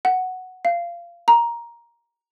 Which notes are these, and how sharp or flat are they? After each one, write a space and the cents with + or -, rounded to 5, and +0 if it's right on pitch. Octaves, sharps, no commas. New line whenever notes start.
F#5 +0
F5 -20
A#5 +10